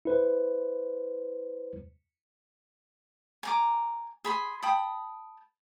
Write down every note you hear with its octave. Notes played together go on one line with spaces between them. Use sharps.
E4 B4 C5
G#5 A#5 D6
G#4 B5 C6
G5 A5 B5 D#6